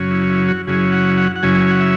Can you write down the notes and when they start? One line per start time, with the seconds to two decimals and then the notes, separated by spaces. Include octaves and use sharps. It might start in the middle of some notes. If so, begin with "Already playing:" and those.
Already playing: F#2 C#3 F#3 C#4
0.11 E4
0.30 E4
0.48 F#4
0.67 F#2 C#3 F#3 C#4 E4 G#4
0.92 F#5
1.17 F#5
1.36 F#5
1.43 F#2 C#3 F#3 C#4 E4 G#5
1.61 G#5
1.71 F#5
1.80 E5